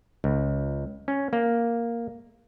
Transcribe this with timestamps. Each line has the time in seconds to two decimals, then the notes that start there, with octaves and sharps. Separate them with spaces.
0.24 C#2
1.08 C#4
1.33 A#3